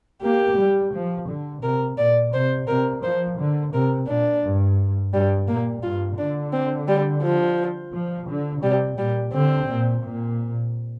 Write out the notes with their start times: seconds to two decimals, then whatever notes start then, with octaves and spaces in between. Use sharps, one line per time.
0.23 A#3 G4
0.58 G3
0.93 F3
1.28 D3
1.63 C3 A#4
1.97 A#2 D5
2.33 C3 C5
2.68 C3 A#4
3.03 F3 C5
3.38 D3
3.73 C3 A#4
4.08 A#2 D4
4.43 G2
5.13 G2 G3
5.47 A#2 A#3
5.83 G2 F4
6.18 D3 D4
6.53 C4
6.88 G3
7.23 F3
7.93 F3
8.28 D3
8.63 C3 G3
8.98 A#2 G3
9.33 D3 C4
9.68 A#2
10.03 A#2